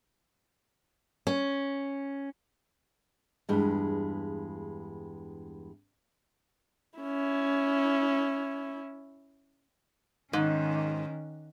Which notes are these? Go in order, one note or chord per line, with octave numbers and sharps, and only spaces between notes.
C#4
E2 G2 G#3
C#4 E4
G#2 D#3 C#4